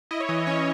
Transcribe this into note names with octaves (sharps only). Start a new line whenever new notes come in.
E4 D#5
C#5
E3 D#5
C#4 C#5